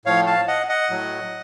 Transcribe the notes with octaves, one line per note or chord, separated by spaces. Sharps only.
A2 F3 C#5 F5
F5 A5
D#5 F#5
D#5 F#5
A2 F#3